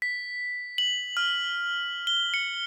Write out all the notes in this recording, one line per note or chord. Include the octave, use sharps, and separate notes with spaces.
B6
F#7
F6
G7
C#7